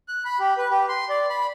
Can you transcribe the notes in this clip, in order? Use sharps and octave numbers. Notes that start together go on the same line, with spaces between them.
F#6
B5
G4
B4
G4
C6
D5
B5